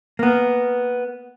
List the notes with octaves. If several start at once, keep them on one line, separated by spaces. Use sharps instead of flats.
A#3 B3